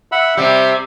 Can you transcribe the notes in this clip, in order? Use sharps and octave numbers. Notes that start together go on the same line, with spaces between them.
E5 F#5 B5
C3 G3 E5